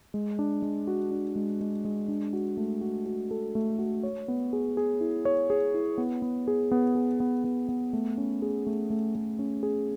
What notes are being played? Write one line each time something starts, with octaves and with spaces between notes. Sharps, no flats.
G#3
D4
G#3
F#4
D4
G#3
G#3
G#3
D4
F#4
A3
F#4
F#4
A4
A3
F#4
C#5
B3
G#4
G#4
E4
C#5
G#4
E4
B3
B3
G#4
B3
G#4
B3
B3
B3
A3
C#4
G#4
A3
A3
A3
C#4
G#4